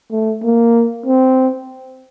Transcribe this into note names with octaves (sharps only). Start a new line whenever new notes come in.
A3
A#3
C4